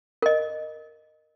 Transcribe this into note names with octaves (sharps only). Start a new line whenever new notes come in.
A#4 D#5